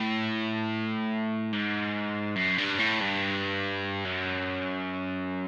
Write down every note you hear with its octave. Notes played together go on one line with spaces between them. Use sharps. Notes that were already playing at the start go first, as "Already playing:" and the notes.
Already playing: A2
G#2
F#2
G2
A2
G2
F#2